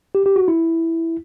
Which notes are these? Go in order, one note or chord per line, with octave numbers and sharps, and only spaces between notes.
G4
G4
F#4
E4